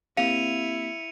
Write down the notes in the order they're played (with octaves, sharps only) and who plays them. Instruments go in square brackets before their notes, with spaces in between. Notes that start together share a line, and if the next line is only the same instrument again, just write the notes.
[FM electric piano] A#3 C4 G4 [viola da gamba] E4 [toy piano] F5 [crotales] C#7 D#7 F7